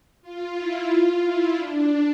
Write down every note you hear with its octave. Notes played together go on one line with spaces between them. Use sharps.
F4
E4
F4
E4
D4